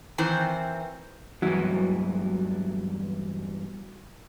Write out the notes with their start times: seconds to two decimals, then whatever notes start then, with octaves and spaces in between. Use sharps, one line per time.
0.18 D#3 E3 C4
1.42 E2 G2 E3 F#3 E4